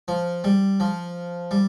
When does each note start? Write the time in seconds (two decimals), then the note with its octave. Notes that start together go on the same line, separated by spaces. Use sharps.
0.08 F3
0.44 G3
0.80 F3
1.51 G3